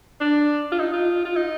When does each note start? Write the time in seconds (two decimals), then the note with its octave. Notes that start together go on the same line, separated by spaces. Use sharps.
0.20 D4
0.72 F4
0.79 D#4
0.93 F4
1.25 F4
1.36 D#4